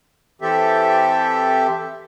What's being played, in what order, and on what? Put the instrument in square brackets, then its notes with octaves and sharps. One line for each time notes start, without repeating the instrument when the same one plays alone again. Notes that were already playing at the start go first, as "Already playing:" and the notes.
[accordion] E3 C4 G4 A4 E5